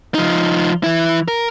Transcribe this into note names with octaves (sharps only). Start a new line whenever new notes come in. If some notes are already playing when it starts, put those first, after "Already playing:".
F3 D#4
E3 E4
A#4